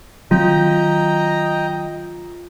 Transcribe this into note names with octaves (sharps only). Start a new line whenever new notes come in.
D#3 F#3 C4 F4 D#5 G5 A#5